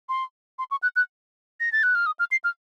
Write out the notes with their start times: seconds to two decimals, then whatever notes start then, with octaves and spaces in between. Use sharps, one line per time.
0.09 C6
0.59 C6
0.71 C#6
0.82 F#6
0.96 F#6
1.60 A#6
1.72 A6
1.83 F#6
1.95 F6
2.06 D#6
2.19 F6
2.31 C7
2.44 F6